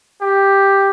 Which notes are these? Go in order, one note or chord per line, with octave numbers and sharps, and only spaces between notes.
G4